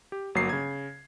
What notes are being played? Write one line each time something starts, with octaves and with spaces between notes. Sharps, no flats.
G4
G1 F#3 A#3 C7
C#3 G#6